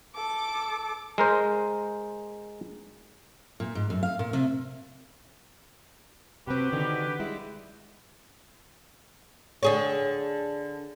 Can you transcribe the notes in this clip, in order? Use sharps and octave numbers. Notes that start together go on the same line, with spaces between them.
A4 D6
G#3 A#4 C5
A#2
G#2
F#2
F5
A#2
C3
C3 C4 F#4 G4 B4
D3 D#3
G3 G#3 E4
D3 G#4 C#5